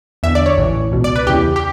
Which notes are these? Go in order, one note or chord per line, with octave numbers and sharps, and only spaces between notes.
E2 D3 E5
D5
C#5
A1 A2 E3
C#2 B2
D5
B4
E2 C#3 E3 G4
G4